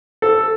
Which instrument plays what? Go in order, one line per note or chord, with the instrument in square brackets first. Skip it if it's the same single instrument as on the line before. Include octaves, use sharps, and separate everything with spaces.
[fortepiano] A4